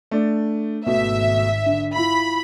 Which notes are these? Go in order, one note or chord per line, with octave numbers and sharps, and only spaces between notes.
A3 D4 D5
G#1 B2 A3 E5
D3
E4 F4 B5